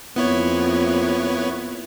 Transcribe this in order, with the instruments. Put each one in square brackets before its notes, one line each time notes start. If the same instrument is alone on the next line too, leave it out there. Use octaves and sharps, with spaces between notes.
[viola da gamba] F2 A#3 [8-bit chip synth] B3 E4 C#5